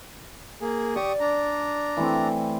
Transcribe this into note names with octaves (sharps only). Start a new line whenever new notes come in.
A#3 G#4
G4 D5 C#6 D#6
D4 A#5
E3 A3 C4